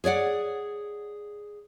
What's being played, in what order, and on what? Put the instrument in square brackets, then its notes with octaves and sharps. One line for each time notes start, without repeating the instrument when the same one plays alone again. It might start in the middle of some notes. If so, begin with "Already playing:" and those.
[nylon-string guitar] G#4 C#5 D5 F#5